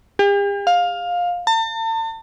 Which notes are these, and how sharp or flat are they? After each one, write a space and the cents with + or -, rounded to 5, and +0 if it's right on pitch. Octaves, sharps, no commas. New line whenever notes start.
G4 +45
F5 +15
A5 +40